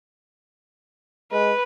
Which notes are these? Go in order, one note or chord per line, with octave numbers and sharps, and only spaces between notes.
G#3 B4